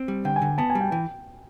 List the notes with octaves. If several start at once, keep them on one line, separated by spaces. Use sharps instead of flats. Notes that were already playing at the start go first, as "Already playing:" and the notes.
Already playing: C4
G3
D3 G5
G#5
D3
B3 A5
G#5
G3
G5
E3 G5